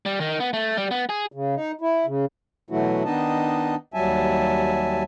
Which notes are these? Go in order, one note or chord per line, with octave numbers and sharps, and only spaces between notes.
G3
D#3
B3
A3
G3
B3
G#4
C#3
D#4
E4
C#3
B2 E3 F#3 A3 E4 F#4
D#3 B3 D4 D#4 D#5 A5
D#2 F#3 G3 E5 G#5 A5